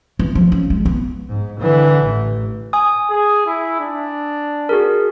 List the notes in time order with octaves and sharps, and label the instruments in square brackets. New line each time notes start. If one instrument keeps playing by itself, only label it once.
[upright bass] E3
F3
C#4
G#3
B3
[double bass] G#2
D3 E3
A1
[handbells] G#5 D#6
[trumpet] G#4
E4
D4
[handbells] F#4 G#4 A#4